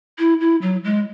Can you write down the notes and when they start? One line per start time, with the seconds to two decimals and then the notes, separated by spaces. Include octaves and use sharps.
0.19 E4
0.41 E4
0.62 F#3
0.84 G#3